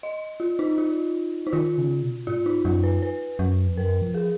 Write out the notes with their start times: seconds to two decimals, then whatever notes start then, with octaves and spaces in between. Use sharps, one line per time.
0.03 D#5
0.40 F4
0.59 D#4
0.78 F4
1.47 D#4
1.53 D#3 F4
1.78 C#3
2.03 B2
2.27 G#2 F4
2.46 D#4
2.65 F#2 F4
2.84 B4
3.02 B4
3.39 F#2
3.67 F2
3.77 F#2 A#4
4.02 F3
4.14 G#4